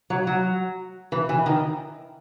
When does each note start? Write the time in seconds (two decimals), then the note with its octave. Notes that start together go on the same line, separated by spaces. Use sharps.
0.10 F#3
0.27 F#3
1.12 E3
1.29 E3
1.46 D#3